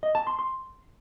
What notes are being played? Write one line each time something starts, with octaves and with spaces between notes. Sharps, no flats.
D#5
A5
C6
C6